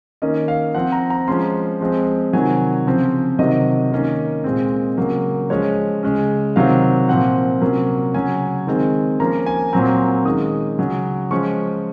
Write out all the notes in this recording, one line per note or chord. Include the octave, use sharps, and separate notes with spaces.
D#3 A#3 C#4 D#5
F5
F3 C4 F#5
A#5
A#5
F3 G#3 C#4 C6
F3 G#3 C4
C3 D#3 F#3 G#5
C#3 F3 C4
C3 D#3 F#3 D#5
D#3 A#3 C#4
A#2 G#3 C4
C#3 F#3 A#3
F3 G#3 C#4 C#5
C#3 G#3 C#4
C3 D#3 F#3 C4 F5
A#2 F3 C4 F#5
C3 F#3 A#3 C#4
C#3 F#3 C#4 G#5
D#3 G#3 C4
F3 A#3 C#4 A#5
G#5
A#2 F#3 C4 A#5
D#3 G#3 C#4 D#6
C#3 F#3 C#4
F3 G#3 C#4 C#6